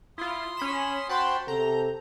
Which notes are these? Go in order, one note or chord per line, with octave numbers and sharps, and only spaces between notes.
E4 F4 C6 D#6
C#4 B5 E7
F#4 C5 G5 A5 B5 C6
C3 A4 A#5 G6